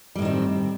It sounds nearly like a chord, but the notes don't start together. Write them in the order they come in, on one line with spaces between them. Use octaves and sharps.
G3 A2 D#3 C4